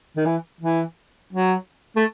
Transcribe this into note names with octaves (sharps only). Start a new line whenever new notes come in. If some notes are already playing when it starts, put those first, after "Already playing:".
D#3
E3
E3
F#3
A3